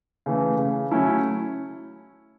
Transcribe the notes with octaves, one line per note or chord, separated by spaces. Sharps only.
C#3 E3 A3
C#3
F#3 A3 C#4 E4